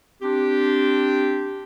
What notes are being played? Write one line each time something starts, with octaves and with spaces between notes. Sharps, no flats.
C4 D4 G4